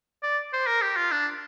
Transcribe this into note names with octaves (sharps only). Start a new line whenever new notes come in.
D5
C5
A#4
G4
F4
D4